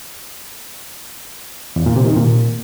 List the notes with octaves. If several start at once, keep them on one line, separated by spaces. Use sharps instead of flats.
E2
A#2
C3
D#3
A#2